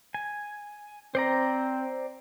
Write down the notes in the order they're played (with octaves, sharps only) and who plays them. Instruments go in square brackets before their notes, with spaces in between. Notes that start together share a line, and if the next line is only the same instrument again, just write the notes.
[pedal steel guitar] G#5
[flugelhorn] C4 [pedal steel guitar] C5 D5 A#5